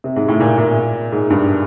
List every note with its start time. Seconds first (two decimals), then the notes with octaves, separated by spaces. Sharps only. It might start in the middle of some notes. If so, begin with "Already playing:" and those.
0.04 C3
0.16 G#2
0.28 A2
0.40 A#2
0.58 A#2
1.12 G#2
1.30 G2